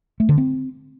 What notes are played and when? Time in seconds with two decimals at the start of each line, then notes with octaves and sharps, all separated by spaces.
0.20 A3
0.29 D3
0.38 C4